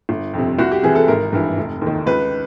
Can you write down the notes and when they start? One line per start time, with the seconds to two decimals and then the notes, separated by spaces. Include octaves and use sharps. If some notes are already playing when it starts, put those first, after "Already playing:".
0.09 G1
0.34 F2 C3
0.59 C2 F#4
0.72 G4
0.83 C3 E3 G#4
0.95 A4
1.08 G#1 A#4
1.33 G2 E3
1.57 F1
1.81 D#2 D#3
2.06 C#2 B4